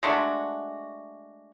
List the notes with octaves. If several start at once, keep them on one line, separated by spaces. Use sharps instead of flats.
G#3 A3 D4 F#4